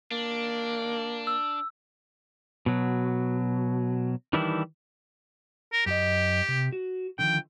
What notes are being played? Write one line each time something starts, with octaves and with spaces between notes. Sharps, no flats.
A#3 D4
E6
B2 F#3
D#3 E3 G3 D4 E4
A#4
F#2 F#4 G4 D#5
C3
F#4
D3 D#3 F3 G5